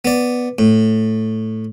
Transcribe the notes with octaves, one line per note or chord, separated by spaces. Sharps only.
B3 D5
A2